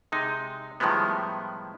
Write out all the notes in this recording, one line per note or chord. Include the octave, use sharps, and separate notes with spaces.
C3 G#3 D#4
A2 D#3 F3 G3 G#3 B3